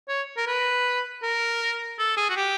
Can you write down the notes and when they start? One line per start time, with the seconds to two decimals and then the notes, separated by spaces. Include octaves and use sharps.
0.09 C#5
0.37 A#4
0.47 B4
1.23 A#4
1.99 A4
2.17 G#4
2.29 F#4
2.36 G4